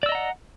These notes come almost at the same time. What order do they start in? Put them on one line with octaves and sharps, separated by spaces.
D5 E6 D#5 A#5 F#5